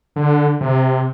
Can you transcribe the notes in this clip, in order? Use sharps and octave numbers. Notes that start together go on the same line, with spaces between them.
D3
C3